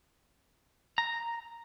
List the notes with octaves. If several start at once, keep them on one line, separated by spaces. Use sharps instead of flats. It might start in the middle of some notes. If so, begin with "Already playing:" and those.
A#5